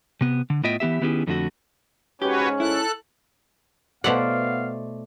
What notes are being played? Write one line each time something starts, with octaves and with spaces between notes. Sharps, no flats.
C3 B3
D3
A2 B3 F4 D#5 E5 G5
E3 B3 G4 E5
D#3 B3 C#4 E4 G4 G#4
F2 D3 A3 E4 F#4
G#2 C#4 F#4 G4 B4 C#5
E4 A4 F#6
B2 A3 B3 E4 C5 D5 F5 F#5